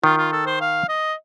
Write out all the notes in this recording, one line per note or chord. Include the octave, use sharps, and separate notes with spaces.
D#3 F4
F4
A4
C5
F5
D#5